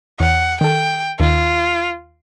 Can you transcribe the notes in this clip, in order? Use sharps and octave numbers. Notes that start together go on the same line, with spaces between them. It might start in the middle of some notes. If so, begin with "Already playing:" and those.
E2 C#5 F#5
D#3 A4 G5
D#2 D#3 F4